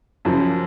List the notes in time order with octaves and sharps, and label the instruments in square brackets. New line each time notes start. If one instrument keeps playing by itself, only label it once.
[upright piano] F#2 C#3 F3